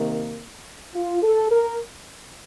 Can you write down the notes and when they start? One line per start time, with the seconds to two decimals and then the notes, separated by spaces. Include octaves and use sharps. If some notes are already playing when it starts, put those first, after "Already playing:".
Already playing: C3 D#3 A#3
0.95 F4
1.23 A4
1.51 A#4